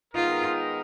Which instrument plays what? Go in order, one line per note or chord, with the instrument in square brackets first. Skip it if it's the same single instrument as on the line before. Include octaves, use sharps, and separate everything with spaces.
[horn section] D#3 G#3 B3 D#4 A#4 [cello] F4